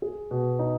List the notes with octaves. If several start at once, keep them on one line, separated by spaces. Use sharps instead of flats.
G#4
B2
D#4